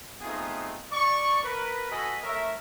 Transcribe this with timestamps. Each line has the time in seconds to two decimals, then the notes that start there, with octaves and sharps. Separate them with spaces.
0.21 A3 B3 C4 D#4 F4 G#4
0.91 D5 C#6
1.43 A#4 B4
1.90 F#4 A4 B4 D#5 G#5 B5
2.22 A3 A#4 C#5 E5